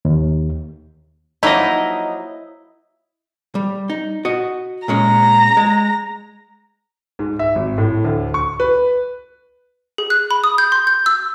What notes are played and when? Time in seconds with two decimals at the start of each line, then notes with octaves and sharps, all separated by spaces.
0.05 D#2
1.43 F3 F#3 A#3 D#4 E4 D#5
3.55 G3
3.90 D#4
4.25 F#4 D#5
4.88 A#2 G#3 C#4 A#5
5.57 G#3
7.19 G#2
7.39 E5
7.55 G#1
7.78 A2
8.05 D2
8.34 C#6
8.60 B4
9.98 G#4
10.10 F#6
10.31 B5
10.44 D#6
10.58 G6
10.72 C6
10.87 G6
11.06 E6